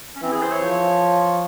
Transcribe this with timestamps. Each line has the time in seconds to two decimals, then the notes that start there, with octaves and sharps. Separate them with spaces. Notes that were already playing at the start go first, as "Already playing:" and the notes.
0.16 C#4
0.22 E3 C4
0.32 G#4
0.42 C5
0.52 C#5
0.62 F3